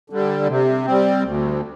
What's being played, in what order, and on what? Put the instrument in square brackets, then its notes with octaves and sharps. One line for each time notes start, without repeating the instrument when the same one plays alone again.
[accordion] D3 G3
C3
G3 C4
D2